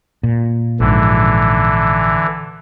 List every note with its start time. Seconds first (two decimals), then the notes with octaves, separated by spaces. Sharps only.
0.23 A#2
0.80 A#1 G#2 D3 E3